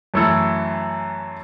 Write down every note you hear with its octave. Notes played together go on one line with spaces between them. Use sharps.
F#2 E3 A3 E4 A4